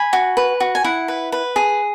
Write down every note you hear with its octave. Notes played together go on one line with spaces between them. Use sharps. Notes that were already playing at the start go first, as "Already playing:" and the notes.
Already playing: G#5 B5
F#4
B4
F#4
G#5
E4 F#5
B4
B4
G#4